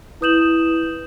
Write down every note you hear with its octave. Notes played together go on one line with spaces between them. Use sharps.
E4 B4 D#6 G6 E7 F#7